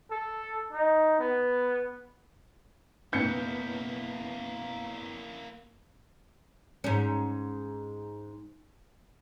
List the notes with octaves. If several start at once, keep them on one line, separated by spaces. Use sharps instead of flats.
A4
D#4
B3
F#1 B2 A#3 C#4 E4 G6 C#7
G#2 C#4